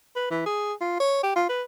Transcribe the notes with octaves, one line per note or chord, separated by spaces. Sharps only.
B4
E3
G#4
F4
C#5
G4
F4
B4